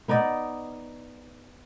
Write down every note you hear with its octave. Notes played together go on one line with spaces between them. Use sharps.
B3 D#4 D5 D#5